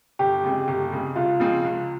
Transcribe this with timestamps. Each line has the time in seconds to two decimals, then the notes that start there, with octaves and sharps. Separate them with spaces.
0.19 G1 G4
0.44 F2 C#3 G#3
0.68 G1
0.92 F2 C#3 G#3
1.16 C#2 F4
1.40 C#3 F3 G#3 C4
1.64 C#2